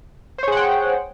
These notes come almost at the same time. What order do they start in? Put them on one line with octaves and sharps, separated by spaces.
C5 C#5 G#4 F#5 G5